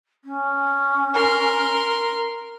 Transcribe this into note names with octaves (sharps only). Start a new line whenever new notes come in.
C#4
A#4 C6